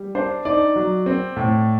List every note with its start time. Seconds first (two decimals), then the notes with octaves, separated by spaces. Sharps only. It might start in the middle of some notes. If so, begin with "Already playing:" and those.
Already playing: G3
0.15 D4 C5
0.45 D#4 D5
0.76 F#3
1.06 C4
1.36 A2